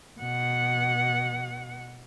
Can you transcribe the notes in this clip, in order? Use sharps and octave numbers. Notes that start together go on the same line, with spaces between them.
B2 F#5